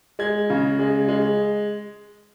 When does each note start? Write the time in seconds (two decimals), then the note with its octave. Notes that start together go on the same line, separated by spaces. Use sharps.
0.19 G#3 G#6
0.50 C#3
0.79 G#3
1.08 G#3